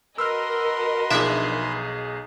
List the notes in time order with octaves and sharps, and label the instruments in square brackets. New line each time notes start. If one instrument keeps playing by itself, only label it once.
[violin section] F#4 A#4 D#5 [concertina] B4 C6 [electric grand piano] E6 F6
[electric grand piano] B1 D#4 G#4 [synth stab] F3 D4 E5